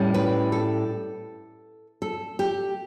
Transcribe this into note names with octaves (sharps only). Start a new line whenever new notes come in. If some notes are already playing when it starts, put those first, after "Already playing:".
Already playing: A2 G3 C#4
B4
A4
A4
G4